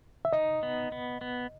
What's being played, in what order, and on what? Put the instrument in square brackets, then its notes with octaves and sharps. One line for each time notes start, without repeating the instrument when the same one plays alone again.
[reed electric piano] E5
[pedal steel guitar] D#4 [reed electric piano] D#5
[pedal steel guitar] B3
B3
B3